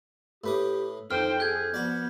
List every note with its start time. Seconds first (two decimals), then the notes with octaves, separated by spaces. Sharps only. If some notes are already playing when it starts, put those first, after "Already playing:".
0.44 A2 G4 B4 D#6
1.11 F2 D#4 C5 G5 F6
1.40 G#4 A4 G6 G#6
1.74 F3 B3 F#4 D5